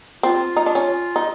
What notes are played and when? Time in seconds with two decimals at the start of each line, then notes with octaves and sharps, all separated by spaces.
0.23 C4 F4
0.56 D#4
0.66 D4
0.75 C#4
1.16 D#4